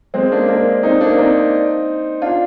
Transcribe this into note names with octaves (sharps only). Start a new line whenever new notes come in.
G#3 C4
A#3 D4
A#3 D4
C4 D#4
A#3 D4
C4 D#4
D4 F4